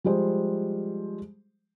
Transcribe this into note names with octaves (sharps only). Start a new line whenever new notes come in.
F3 G3 G#3 C5